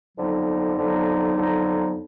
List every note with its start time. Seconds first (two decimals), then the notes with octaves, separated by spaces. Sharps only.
0.17 F2 D3 F#3 B3 D#4
0.77 F2 D3 F#3 B3 D#4
1.37 F2 D3 F#3 B3 D#4